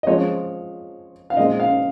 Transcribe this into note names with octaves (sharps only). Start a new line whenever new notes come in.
D#5
F3 G#3 C4 C#5
F5
A#2 G#3 C4 D#5
F5